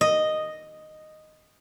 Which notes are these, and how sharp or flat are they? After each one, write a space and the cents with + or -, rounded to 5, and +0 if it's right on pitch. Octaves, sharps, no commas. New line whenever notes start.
D#5 -5